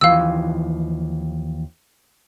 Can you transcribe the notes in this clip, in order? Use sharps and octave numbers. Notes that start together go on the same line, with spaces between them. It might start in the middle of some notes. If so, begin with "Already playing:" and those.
D#2 E3 F3 F5 E6